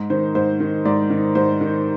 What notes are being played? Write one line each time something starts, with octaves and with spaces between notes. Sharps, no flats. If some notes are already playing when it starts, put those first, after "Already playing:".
Already playing: G#2
D#3 C5
G#2 C5
D#3
G#2 D5
D#3
G#2 C5
D#3